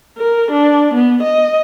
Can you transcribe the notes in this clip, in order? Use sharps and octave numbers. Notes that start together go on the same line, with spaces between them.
A#4
D4
B3
D#5